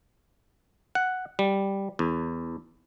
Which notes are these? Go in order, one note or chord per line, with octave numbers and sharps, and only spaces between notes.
F#5
G3
E2